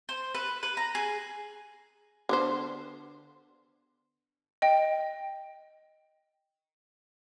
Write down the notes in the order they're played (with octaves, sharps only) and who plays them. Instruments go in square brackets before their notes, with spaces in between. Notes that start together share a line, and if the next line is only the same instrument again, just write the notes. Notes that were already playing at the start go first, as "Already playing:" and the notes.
[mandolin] C5
B4
B4
A#5
G#4
[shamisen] D3 B3 C5
[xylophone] D#5 G5